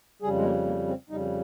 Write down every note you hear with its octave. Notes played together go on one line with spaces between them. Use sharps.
F2 C#3 G3 G#4
G#3
A#3
A#3
C4
F2 C#3 G3 D#4